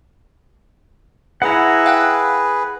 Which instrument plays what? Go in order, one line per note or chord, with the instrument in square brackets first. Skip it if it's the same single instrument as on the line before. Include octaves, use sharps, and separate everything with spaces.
[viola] E4 [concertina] G#4 B4 [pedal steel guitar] F#5 A#5
[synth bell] F5 G5 F#6